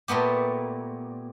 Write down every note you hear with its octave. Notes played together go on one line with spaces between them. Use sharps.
A#2 A3 B3 G4